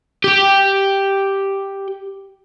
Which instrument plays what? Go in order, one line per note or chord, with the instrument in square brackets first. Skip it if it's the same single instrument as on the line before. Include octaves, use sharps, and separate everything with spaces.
[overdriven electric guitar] G4 G5